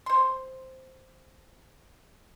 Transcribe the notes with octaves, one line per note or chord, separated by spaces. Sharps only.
C5 C6